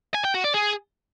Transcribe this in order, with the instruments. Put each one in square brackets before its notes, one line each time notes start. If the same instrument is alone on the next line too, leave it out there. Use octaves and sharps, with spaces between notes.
[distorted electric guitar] G#5
G5
F#4
D5
G#4